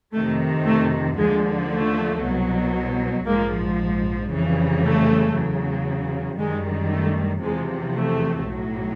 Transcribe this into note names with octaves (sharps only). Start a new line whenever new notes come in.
F2 C3 D#3 A3
A3
D#2 D3 F3 G#3
A3
C2 B2 F#3
A#1 G#2 F3 G#3 A#3
F2 C#3 E3 G3
A3
E2 C#3 F#3
F#2 D#3 G3 G#3
A3
E2 C3 F3 G#3
A3
B1 A2 F#3